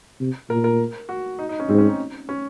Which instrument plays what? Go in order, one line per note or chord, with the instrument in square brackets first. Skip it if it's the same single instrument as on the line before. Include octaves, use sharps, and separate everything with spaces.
[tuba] C3
[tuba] A#2 [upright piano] A#4
[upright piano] A#4
F#4
D#4
D#4
C#4
[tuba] G#2 [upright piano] C4
[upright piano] C#4
D#4
C#4